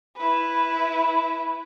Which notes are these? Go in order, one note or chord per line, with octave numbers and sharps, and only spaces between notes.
E4 B4